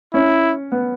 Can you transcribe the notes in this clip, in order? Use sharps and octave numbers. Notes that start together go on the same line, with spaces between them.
C#4 E4
B3